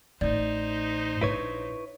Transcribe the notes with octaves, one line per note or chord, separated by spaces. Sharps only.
A1 A2 D#4 C5 D5
A#1 E4 B4 C#5